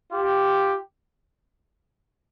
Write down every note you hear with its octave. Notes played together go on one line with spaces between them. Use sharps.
F4 G4